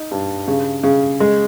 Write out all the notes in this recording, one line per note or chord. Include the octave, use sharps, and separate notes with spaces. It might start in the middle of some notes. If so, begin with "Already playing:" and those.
Already playing: D#4
G2
C#3
C#3
G#3